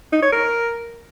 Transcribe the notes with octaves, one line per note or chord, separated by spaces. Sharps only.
D#4
C#5
A#4